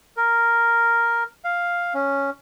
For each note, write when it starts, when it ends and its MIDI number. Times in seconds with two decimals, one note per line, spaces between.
0.17 1.23 70
1.44 1.93 77
1.94 2.30 61